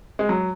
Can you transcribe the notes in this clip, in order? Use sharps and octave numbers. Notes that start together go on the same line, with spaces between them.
G#3
F#3